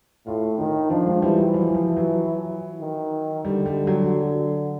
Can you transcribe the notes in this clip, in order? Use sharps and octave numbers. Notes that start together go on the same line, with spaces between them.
A2 F4
D#3 D#4
F3 D4
G#3
E3 G3
F#3
F3
F3
F#3
D#3
D3 G3
G3
F#3